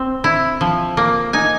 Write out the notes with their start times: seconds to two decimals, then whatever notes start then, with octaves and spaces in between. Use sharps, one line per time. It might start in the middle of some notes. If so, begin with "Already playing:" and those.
Already playing: C4
0.24 E4
0.61 F3
0.97 A#3
1.33 D#4 G#5